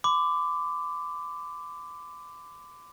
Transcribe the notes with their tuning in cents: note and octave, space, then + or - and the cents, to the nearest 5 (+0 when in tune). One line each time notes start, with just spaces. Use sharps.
B5 +40 D6 +0